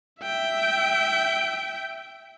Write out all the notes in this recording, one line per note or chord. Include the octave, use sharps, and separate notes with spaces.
E5 G5